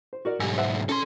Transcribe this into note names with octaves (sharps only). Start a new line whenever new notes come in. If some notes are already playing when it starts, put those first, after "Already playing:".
C5
F#4 A#4 D5
B1 G#2 G3 G#5 E6
C5 E5 F#5
C#4 A4 C6